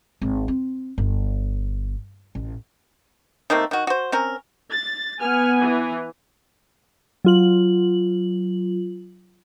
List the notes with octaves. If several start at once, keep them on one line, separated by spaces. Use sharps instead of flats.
G#1
C4
G1
A1
D#3 A3 A#3 C4
D#3 F#4
F#4 C5
C4 C#4 A#4
A6
B3 G#5 F6
E3
F#3 F4 F#7